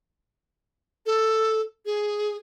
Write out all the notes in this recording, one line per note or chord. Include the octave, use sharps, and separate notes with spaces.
A4
G#4